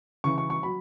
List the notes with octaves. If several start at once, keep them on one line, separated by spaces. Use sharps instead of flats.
C#3 E3 C#6
C#6
C#6
F#3 B5